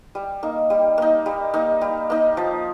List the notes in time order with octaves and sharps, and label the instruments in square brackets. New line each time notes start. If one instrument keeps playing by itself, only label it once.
[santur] G3
A#3 D#4
G3
A#3 D#4
G3
A#3 D#4
G3
A#3 D#4
F3